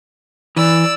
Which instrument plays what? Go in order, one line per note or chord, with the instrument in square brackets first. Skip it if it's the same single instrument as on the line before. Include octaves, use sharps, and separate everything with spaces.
[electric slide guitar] E3 [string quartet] D5 E6